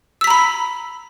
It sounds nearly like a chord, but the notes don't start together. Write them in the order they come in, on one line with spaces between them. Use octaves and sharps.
E6 B6 A#5 B5